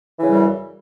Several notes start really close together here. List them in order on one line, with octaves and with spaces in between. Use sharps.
E3 C#3 G3 F#2